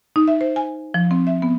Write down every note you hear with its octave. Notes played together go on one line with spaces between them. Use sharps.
D#4
E5
C5
G#5
F3
C4
E5
B3